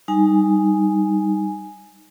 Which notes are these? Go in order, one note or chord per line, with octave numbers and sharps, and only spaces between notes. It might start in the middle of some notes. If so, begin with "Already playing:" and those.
G3 D#4 G#5